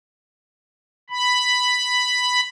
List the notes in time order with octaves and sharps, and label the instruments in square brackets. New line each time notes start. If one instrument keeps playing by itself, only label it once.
[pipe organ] B5